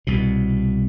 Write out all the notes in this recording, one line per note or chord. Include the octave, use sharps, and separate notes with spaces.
C2 B2